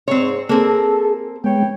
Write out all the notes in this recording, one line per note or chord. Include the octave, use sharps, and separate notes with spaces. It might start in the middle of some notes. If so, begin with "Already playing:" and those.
G#2 C4 C#5
A#3 C4 G#4 A4
G#3 B3 B4 C#5 G5